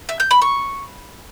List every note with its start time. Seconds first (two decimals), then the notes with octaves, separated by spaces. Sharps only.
0.09 E5
0.20 G6
0.31 B5
0.42 C#6